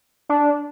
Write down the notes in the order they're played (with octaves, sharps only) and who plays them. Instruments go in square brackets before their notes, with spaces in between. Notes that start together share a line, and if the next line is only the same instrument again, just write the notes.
[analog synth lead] D4